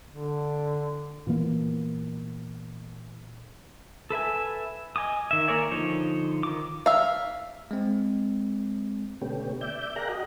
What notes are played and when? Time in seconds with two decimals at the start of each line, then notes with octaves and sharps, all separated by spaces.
0.10 D3
1.27 A#2 E3 A#3 B3
4.10 A4 B4 E5 G#5
4.96 D#5 G#5 D6 D#6
5.31 D#3 E5
5.48 A#3 A#4 C#5 D5 G#5
5.71 D3 F3 D#4 C#5
6.43 D#3 D6
6.86 E5 F5
7.71 G#3 C4
9.21 B2 D3 A3 B3 C#4 G4
9.61 D5 E5 G6
9.96 G#4 A#4 F5 G5 A#5 F#6
10.09 F#4 D#5